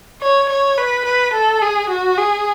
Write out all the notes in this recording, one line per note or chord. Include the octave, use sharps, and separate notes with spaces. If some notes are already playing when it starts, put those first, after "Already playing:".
C#5
C#5
B4
B4
A4
G#4
F#4
G#4